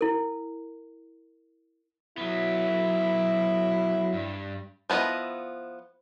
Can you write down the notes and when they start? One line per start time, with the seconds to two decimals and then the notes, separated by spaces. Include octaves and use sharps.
0.01 E4 A#4
2.18 F#3 B3 E4
4.14 G2
4.90 F3 B3 E4 D#5